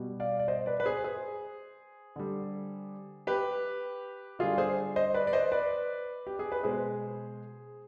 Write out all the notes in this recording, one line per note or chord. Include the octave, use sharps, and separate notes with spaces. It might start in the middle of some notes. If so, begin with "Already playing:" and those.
Already playing: B2 G3
D5 F5
D5
C5 D#5
B4 D5
B4
G#4 C5
G#4 C5
D3 G3
G4 B4
D3 G3 F4 G#4
G#4 C5
C5 D#5
B4 D5
D5
C5 D#5
B4 D5
G4
G#4
B4
B2 G#3 G#4 C5